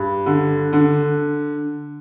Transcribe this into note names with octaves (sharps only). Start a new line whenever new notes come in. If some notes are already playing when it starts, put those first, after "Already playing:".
Already playing: G2
D3
D3